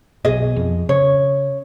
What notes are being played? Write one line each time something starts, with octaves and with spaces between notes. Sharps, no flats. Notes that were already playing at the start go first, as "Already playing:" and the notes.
B1 B2 G#4 D#5
F2
C#3 C#5